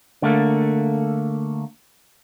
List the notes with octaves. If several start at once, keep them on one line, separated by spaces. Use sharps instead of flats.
D3 A3 A#3